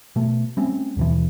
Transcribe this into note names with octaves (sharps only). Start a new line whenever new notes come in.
B2 A3
G3 A3 C4 C#4
D#2 B2 E3